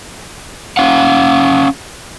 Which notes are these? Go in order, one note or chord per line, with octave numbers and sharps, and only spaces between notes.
C#4 F5 F#5